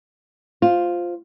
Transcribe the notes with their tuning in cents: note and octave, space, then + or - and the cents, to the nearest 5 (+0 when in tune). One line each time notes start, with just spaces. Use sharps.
F4 +5 C5 +0